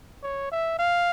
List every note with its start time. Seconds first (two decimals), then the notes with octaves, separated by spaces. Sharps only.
0.23 C#5
0.51 E5
0.79 F5